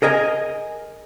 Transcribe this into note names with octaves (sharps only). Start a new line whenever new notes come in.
G#4 A#4 D#5 G#5